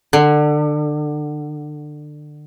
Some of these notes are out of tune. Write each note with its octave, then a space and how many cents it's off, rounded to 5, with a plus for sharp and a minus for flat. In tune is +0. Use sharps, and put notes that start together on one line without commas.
D3 +25